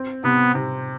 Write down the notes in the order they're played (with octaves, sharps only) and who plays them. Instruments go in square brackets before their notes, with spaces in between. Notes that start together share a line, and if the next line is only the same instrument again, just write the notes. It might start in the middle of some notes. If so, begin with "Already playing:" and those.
Already playing: [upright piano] C4
[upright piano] C3 [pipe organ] B3
[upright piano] C3